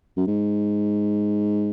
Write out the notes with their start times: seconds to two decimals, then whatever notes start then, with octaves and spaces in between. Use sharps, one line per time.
0.17 F#2
0.27 G#2